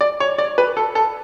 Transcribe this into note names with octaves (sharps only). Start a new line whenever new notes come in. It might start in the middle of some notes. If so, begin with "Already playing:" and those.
D5
C#5
D5
B4
A4
A4